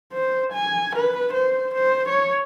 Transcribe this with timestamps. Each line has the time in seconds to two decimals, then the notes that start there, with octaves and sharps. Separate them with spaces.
0.13 C5
0.53 G#5
0.96 B4
1.34 C5
1.75 C5
2.09 C#5